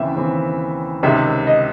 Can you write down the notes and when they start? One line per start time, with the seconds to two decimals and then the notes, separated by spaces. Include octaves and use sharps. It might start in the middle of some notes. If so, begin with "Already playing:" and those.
Already playing: D#2 C#3 E3 C4 E5
0.15 D#2 C#3 E3 C4
1.03 C#2 C3 D#3 E5
1.47 D#5